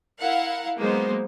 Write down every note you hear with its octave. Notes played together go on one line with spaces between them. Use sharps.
E4 A#4 F5 F#5
F#3 G#3 A#3 B3 D#4 C5